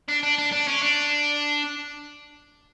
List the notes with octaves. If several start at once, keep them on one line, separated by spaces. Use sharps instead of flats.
D4
D4
D4
D4
C#4
D4